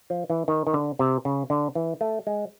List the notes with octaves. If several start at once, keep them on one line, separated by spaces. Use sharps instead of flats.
F3
E3
D#3
D#3
D3
C3
C#3
D3
E3
A3
G#3